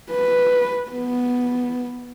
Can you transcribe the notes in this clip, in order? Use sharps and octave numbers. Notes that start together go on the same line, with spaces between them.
B4
B3